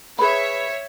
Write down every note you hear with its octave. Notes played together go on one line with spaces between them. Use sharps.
G#4 B4 C#5 E5 B5